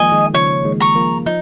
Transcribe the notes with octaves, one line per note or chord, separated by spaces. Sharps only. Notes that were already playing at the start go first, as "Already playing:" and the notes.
Already playing: D#3 F3 G#3 A#3 D#5 G#5
D#3 G#3
C#3 F3 C#5
D#3 G#3
A#5 C#6
F3 A#3
F3 D#4